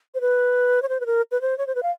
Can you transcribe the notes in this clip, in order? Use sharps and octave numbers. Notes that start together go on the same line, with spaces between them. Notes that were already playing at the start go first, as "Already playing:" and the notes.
C5
B4
C#5
C5
B4
A#4
B4
C5
C#5
C5
B4
F5